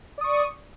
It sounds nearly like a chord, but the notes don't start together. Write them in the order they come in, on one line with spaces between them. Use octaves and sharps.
D5 D#6 C#6